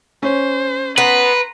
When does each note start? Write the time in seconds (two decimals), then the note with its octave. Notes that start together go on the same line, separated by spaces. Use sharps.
0.23 C#4 C5
0.98 B3 B4 A#5 C6